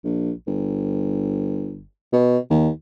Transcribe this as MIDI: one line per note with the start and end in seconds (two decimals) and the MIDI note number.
0.04 0.31 34
0.47 1.83 31
2.13 2.38 47
2.50 2.69 39